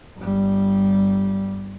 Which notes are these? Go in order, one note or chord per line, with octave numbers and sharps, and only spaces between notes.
G1 G3